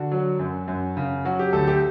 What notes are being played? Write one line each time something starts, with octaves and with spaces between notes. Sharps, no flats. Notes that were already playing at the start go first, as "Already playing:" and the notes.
Already playing: D3 F#4
F#3
F#2
F#2
C#3
F#3 F#4
G4
D2 A4
G4